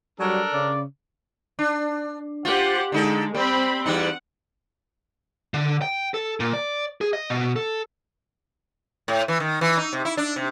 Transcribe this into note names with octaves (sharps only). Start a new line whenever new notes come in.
F#3 G3 D4 A4 A#4
C#3 D5
D4
F4 G4 C5 F#5
D3 G#3 D#4 A4
G3 C4 B5
E2 G3 D#4 F#5
D3
G5
A4
A#2
D5
G#4
D#5
B2
A4
A2
E3
D#3
E3
D#4
C3
E4
D4
C3